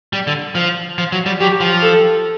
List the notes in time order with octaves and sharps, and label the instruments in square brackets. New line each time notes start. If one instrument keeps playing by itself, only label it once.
[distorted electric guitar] G3
D3
F3
F3
F#3
G3
[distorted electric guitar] F#3 [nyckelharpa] G4
[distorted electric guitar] F3
[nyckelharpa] A4